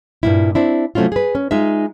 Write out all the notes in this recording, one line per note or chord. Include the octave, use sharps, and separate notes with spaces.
G2 A#2 E4
C4 D4 E4
C3 F#3 A3 C#4 E4 F4
G#4 B4
C#4
G#3 D#4 F4 E5